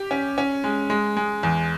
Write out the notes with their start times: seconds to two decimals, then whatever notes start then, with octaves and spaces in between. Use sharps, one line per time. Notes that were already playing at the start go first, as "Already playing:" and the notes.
Already playing: G4
0.11 C#4
0.38 C#4
0.64 G#3
0.90 G#3
1.17 G#3
1.43 E2